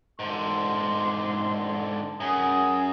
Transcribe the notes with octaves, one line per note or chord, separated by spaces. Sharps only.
G#2 D3 C6
F#2 G#4